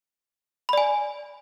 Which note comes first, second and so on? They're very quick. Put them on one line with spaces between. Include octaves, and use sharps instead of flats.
B5 D5 G#5